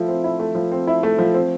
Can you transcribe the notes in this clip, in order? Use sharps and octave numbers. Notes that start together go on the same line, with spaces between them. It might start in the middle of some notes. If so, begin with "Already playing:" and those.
Already playing: F3 A3 E4
C4
E4
A3
F3
C4
E4
A3
F3
C4